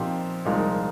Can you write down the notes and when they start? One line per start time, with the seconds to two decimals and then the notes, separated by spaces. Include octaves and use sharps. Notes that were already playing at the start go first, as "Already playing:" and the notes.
Already playing: A#2 F3 C4 D#4 G4
0.45 C2 A#2 F3 G#3 D#4